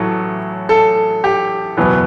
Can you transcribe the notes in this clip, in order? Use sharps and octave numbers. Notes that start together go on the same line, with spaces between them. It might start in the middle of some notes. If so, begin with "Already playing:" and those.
Already playing: A1 A2 F#3 A4
A4
G4
F#1 E2 B2 F#3 B3